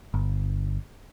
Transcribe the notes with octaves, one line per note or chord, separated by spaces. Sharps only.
G1